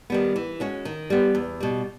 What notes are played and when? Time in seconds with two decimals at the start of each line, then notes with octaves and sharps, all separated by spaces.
0.10 D#3 G3 B3
0.36 E3
0.60 G#3 C#4 F#4
0.85 D#3
1.10 G3 B3
1.35 E2
1.60 B2 G3